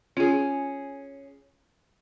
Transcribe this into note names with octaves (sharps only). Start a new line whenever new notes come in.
C#4 F4 G#4